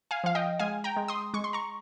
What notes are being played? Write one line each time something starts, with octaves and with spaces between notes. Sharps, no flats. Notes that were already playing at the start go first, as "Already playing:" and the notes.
F5 G#5
F3 F5
D#5 G5
G#3 F5 G#5
G5 A#5
G#3
C6 D#6
G#3 C#6
C6
A#5 C#6